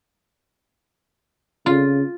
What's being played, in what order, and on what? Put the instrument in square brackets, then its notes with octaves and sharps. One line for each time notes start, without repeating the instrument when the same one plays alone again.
[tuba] C#3 [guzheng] F4